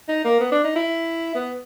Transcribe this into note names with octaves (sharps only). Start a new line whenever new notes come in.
D#4
A#3
B3
D4
D#4
E4
B3